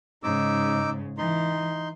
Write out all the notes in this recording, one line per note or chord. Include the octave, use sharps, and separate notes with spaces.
G#2 C#3 D#4 D6 E6
E3 D#4 C6